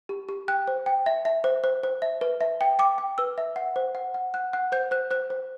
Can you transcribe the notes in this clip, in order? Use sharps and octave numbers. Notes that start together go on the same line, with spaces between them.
G4
G4
G5 F#6
C5
G5
E5
E5
C5
C5
C5
E5
B4
E5
G5
G5 D6
G5
B4 E6
E5
F#5
C5
F#5
F#5
F#5 F#6
F#5 F#6
C5 G6
C5 F#6
C5 F#6
C5